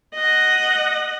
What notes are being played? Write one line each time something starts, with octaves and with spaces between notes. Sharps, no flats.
D#5 F#5